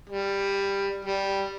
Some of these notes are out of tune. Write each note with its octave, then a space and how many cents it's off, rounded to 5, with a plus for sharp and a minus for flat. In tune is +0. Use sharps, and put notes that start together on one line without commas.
G3 +10
G3 +0